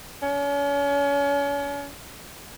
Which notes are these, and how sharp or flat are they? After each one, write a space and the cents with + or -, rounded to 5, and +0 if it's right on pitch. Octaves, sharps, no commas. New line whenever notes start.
C#4 +35